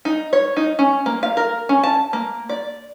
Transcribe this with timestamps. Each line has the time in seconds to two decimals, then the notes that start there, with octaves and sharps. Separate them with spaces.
0.05 D#4
0.33 C#5
0.57 D#4
0.79 C#4
1.06 A#3
1.23 F5
1.37 A#4
1.69 C#4
1.84 A5
2.13 A#3
2.49 D5